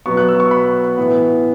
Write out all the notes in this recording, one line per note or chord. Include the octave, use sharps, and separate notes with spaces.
B2 F#3 B3 C#6
F#6
E6
C#6
B5
A2 E3 B3